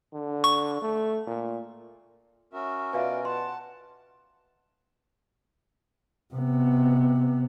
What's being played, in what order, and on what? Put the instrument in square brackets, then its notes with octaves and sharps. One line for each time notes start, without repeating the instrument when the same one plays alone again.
[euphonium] D3
[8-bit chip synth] C#6
[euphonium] A3
A#2
[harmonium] C#4 F#4 A#4 [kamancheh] E5
[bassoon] B2 [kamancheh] F4 D5 [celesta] E5 F5 G#5
[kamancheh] F#5 A5 [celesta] C6
[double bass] C3 B3